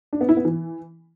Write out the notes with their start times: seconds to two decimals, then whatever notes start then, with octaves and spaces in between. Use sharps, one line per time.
0.13 D4
0.21 B3
0.29 E4
0.37 B3
0.45 E3